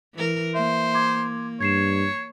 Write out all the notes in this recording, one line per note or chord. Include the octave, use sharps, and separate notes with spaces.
E3 A#4
A#3 C5 E5
C6 D6 G#6
G2 C#5 G#6 C7 E7